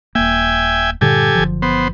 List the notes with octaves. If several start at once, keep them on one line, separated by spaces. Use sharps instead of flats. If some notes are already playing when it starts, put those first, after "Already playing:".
D#1 A#3 E5 G5 G#5
G2 A#2 D3 G4 A4 G#5
F#1 D3 F3
B3 C5